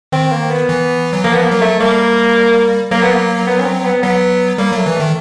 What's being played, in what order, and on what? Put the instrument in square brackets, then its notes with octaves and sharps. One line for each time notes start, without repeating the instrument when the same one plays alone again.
[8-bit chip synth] D#3 [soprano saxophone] C4
[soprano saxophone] A#3
B3
[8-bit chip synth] E3
F#3
[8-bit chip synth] F3 [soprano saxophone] A#3
[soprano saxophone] B3
A#3
[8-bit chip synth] F#3
[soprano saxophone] A3
[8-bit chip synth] G3 [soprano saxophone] A#3
[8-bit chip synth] F#3 [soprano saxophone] A#3
[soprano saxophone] B3
A#3
B3
C#4
C4
C4
B3
[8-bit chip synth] F#3 [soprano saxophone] B3
[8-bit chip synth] G3 [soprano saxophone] A#3
[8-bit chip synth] F#3 [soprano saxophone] A3
[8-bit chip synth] E3
[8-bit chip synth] D#3 [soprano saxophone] A3